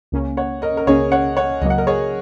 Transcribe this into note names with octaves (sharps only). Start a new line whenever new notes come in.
C#2 C#3 A#3 C#4
C#5 F#5
A#4 D#5
A#4
C#2 C#3 A#3 C#4 G#4 C#5
C#5 F#5
C#5 F#5
C#2 C#3 F#3 A#3 D#5
F#5
A#4 D#5
G#4 C#5